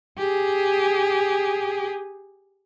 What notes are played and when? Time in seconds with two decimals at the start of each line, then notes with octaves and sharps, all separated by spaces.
0.18 G4 G#4